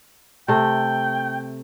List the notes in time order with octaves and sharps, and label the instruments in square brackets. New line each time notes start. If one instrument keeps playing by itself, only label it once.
[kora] C3 A3 [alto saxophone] G5